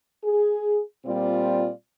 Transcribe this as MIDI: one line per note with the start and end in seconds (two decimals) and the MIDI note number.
0.24 0.81 68
1.06 1.71 46
1.06 1.71 55
1.06 1.71 60
1.06 1.71 65
1.06 1.71 74